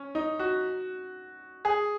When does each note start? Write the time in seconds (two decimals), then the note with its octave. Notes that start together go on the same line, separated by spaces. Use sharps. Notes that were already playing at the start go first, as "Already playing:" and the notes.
Already playing: C#4
0.15 D#4
0.39 F#4
1.65 G#4